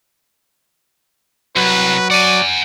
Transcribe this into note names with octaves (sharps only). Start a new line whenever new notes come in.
C2 F#3 B4
D5 F#5 G#5